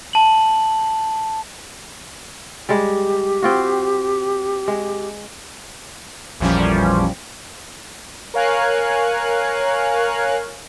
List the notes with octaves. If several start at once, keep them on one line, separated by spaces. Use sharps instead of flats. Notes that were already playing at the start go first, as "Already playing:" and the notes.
A5 F#7
G3 G#3 G4
C4 F4 F#4
G#3
A1 E2 A#2 F3 G3 C#4
A#4 C#5 F5 G#5 F#6